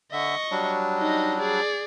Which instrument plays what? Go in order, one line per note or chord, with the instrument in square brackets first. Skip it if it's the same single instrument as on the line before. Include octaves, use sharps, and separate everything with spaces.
[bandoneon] D3 E5 [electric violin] D#5 C#6
[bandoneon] F#3 G3 D4
[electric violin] D#4 D#5
G#4 D5